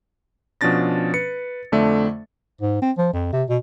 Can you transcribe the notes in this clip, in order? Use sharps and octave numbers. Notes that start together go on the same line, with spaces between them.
B2 F3 C#4 D4 A6 A#6
B4 C#7
F2 D3 A3 D5 E5
G#2
C4
F3
F2
C3
B2